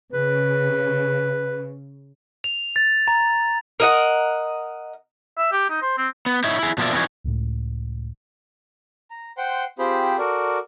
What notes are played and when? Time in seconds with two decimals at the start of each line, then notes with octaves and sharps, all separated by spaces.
0.13 C#3 B4
2.44 F7
2.76 A6
3.08 A#5
3.80 A#4 D#5 F#5
5.38 E5
5.52 G4
5.70 D#4
5.82 C5
5.98 C4
6.26 B3
6.44 D#4 E4 C#5 E5
6.59 E4 G#4
6.78 B2 F3 A#3 C5 D5 E5
6.93 F2 E3 F#3 C#4 D#4 C#5
7.24 C#2 A2
9.11 A#5
9.37 C5 F#5 G5 C6
9.79 C4 F4 G4 G#4 C5 B5
10.19 F#4 A4 A#4 D5